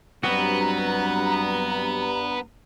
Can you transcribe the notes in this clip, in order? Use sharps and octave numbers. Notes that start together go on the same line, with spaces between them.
G2 F#3 B3 C4 F#4 A#5